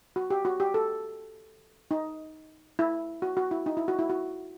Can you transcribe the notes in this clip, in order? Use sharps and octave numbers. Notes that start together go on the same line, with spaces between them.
F#4
G4
F#4
G4
A4
D#4
E4
F#4
F#4
E4
D#4
E4
F#4
E4
F#4